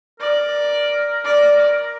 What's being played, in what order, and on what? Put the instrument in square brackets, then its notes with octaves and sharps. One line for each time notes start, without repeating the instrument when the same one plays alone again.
[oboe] A#4 [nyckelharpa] D5
[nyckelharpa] D5